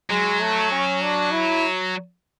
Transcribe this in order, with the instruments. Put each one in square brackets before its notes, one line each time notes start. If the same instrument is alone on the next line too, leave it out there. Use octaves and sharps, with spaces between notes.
[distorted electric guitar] F#3 [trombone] G#3
[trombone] A3
C#4
D4
E4